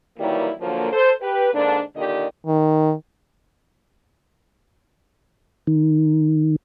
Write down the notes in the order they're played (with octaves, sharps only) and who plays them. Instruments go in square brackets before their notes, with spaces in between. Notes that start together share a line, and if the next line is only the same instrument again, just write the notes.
[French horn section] D#3 E3 F#3 G3 A#3 E4
D3 F3 F#3 A#3
A4 C5
G4 B4
G#2 D3 A#3 D4
A#2 D3 D#3 G4 D5 D#5
[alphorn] D#3
[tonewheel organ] D#3